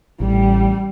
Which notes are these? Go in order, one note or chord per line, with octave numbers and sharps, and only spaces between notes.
A1 G3